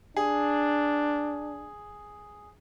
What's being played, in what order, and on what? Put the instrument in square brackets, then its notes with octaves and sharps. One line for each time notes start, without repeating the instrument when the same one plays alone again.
[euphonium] D4 [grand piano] G#4